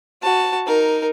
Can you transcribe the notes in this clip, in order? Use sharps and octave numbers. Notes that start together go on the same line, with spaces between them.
F#4 A5
D#4 A#4